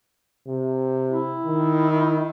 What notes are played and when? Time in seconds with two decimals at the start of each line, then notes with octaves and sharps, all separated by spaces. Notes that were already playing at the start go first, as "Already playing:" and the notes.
0.47 C3
1.10 E4
1.46 D#3